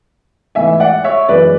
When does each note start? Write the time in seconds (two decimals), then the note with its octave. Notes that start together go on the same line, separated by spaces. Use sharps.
0.55 G#2 E3 A3 E5 G#5
0.80 D5 F#5
1.04 C#5 E5
1.29 F#2 E3 G#3 B4 D5